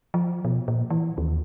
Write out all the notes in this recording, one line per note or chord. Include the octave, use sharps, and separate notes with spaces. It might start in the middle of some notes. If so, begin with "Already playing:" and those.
F3
B2
A#2
E3
D#2